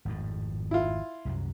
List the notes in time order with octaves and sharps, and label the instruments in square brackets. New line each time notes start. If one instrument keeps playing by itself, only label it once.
[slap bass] G#1 F2 A2
[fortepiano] E4 F4
[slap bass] C2 F#2 F#3